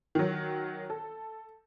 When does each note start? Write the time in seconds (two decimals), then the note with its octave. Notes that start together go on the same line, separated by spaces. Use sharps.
0.15 D#3 F#3
0.90 A4